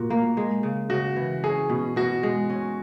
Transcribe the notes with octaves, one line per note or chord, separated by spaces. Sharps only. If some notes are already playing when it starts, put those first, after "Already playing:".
Already playing: A#2 F#4
A#3
G#3
C#3
C#3 F#4
E3
C#4 G#4
B2
B2 F#4
G#3
C#4